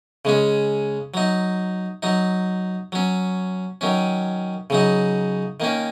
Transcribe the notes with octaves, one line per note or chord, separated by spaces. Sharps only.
C#3 G#3 C#4
F#3 D#4
F#3 D#4
F#3 C#4
D#3 F#3 C#4
C#3 F#3 D#4
D#3 A#3 C#4